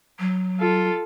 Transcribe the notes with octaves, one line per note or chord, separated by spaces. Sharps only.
F#3
F4 A4